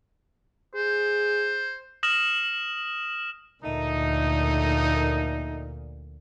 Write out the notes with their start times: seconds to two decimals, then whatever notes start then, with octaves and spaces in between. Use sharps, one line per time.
0.75 G#4 C5
2.03 D#6 F6 A#6 E7 F#7
3.63 D2 A#2 A3 A#3 D#4